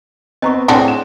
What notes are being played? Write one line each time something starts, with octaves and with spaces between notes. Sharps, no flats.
B3 C4 D#5 A#5 C#6
A2 G#3 C4 D4 F#4 G5 C6
E7